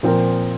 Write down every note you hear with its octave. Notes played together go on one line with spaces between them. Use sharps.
A#2 F3 C4 F4 A#4